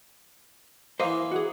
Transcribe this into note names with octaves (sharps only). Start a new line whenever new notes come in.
E3 A#3 C5 D#5 F5
F#4 G#4